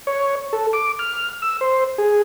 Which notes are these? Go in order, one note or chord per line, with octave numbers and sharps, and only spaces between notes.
C#5
A4
D6
F6
E6
C5
G#4